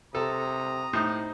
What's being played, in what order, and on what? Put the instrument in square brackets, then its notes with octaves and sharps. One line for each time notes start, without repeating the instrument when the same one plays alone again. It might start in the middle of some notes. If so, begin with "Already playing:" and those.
[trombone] C3 [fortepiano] A4 [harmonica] A#5 D#6
[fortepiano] A2 [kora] D#4 C5